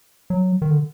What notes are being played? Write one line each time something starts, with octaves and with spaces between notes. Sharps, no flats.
F#3
D#3
D3